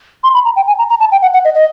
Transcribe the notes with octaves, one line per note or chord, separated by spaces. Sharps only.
C6
B5
A#5
G5
G#5
A#5
A#5
A5
G5
F#5
F#5
D#5
D#5